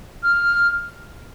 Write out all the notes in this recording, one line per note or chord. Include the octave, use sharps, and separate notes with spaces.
F6